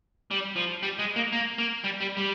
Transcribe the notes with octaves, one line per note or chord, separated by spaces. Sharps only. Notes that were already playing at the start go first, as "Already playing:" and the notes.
G3
F3
G3
G#3
A#3
A#3
A#3
G3
G3
G3